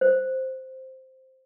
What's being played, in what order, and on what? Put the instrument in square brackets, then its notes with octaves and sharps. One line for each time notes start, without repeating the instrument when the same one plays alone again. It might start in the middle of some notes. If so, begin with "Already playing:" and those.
[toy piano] C5